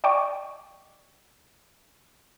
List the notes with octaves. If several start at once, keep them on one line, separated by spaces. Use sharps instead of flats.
D5 D#5 G5 C#6 D6